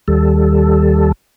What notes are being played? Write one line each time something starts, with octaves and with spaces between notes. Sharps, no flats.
D#2 G3 A4